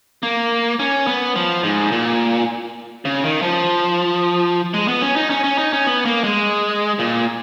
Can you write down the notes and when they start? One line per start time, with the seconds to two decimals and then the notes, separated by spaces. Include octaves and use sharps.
0.23 A#3
0.79 C#4
1.07 B3
1.36 F3
1.63 G#2
1.92 A#2
3.05 C#3
3.24 D#3
3.42 F3
4.74 G#3
4.88 B3
5.02 C#4
5.16 D#4
5.30 C#4
5.44 C#4
5.58 D#4
5.73 C#4
5.87 B3
6.05 A#3
6.24 G#3
6.99 A#2